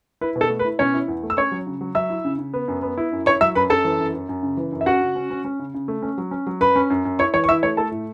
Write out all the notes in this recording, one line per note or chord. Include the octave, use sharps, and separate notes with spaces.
E4 B4
B2
A4
A3
B4
E4
B2 C#4 C#5
E4
E2
A3
E6
C#4 C#5 C#6
F#3
C#3
F#3
F#3 E5 E6
E4
C#3
C#3
B3
F#2
B3
E4
F#2
E4 C#5 C#6
F#3 E5 E6
F#2 B4 B5
F#2 A4 A5
E3
F#2
F#2
F#2
C#3
E3
F#2
E5
C#4 F#4 F#5
C#3
C#4
C#4
C#4
C#3
C#3
A3
C#4
F#3
C#4
F#3
F#2 B4 B5
C#4
F#2
F#2
E4 C#5 C#6
E3 C#5 C#6
C#6
E4 E5 E6
A3 C#5 C#6
A3 A4 A5
A2